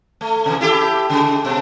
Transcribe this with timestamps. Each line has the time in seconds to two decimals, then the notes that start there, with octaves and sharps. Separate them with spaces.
0.21 A3
0.46 C3 E3
0.61 E4 G4 A4
1.10 C#3 G#3
1.45 B2